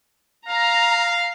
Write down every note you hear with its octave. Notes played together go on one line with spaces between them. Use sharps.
F5 A#5